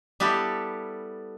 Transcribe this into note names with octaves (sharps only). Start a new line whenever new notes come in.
G3 B3 E4 G4 A4